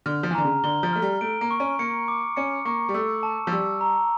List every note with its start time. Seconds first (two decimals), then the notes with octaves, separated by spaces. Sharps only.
0.06 D3 F6
0.23 F3
0.31 E3
0.35 D3 A#5
0.44 C#3
0.64 D3 G7
0.83 F3
0.93 A3 F6
1.02 G3
1.21 A3 D7
1.41 A#3
1.51 C#6
1.60 C#4
1.79 A#3 C#7
2.08 D6
2.37 C#4 C#7
2.65 A#3 C#6
2.89 G3
2.94 A3 E6
3.23 A5
3.47 F3
3.52 G3 E6
3.81 A#5